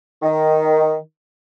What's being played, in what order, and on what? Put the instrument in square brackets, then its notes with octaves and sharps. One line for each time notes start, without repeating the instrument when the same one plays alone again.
[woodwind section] D#3